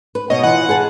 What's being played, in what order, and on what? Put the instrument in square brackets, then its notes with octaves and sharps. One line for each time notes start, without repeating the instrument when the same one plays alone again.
[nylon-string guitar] B4
[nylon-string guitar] B2 C#5 [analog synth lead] D#5
[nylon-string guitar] E3 F4 [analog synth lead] F#5
[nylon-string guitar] G#4 B4 A5